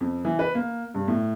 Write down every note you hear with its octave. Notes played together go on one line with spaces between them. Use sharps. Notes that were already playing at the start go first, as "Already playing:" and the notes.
F2
E3
B4
A#3
G2
A2